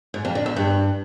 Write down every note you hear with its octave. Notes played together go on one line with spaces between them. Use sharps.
G#2
F2
D3
E2
G2